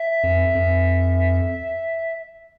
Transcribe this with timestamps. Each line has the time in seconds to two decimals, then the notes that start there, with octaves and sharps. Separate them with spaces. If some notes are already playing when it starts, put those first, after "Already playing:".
Already playing: E5
0.23 F2
0.55 F2